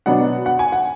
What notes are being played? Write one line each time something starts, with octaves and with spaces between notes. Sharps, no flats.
B2 F#3 B3 D4 F#5
F#5
G#5
F#5